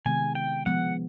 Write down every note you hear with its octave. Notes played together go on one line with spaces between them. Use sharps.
C3 D#3 G#3 B3 G#5
G5
F3 G#3 B3 F#5